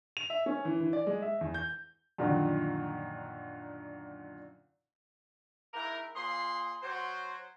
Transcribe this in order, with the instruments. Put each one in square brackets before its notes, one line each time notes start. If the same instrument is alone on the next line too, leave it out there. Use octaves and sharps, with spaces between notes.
[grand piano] F7
E5
C#4
E3
E3
D5
G#3
E5
E2
G6
[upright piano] F#2 A#2 D3 D#3 F3
[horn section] G#2 E4 A#4
A#2 F4 G#4 C6
F#3 F#4 C5